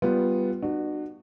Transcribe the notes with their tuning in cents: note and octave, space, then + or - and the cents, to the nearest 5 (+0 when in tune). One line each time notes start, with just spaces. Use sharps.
G3 +0 B3 +0 F4 +5
D4 +45 F#4 +0